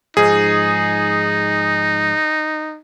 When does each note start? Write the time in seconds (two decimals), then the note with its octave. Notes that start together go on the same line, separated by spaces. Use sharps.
0.17 G#2 F3 G#3 D#4 G#4